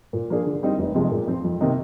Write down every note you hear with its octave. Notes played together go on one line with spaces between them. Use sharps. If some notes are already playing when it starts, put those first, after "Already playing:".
A#2
F3 A#3 D4 G#4
D3
G3 C4 D#4
F1
F2 C3 F3 G#3
A#2
F3 C4
F2
C3 D#3 A#3 D#4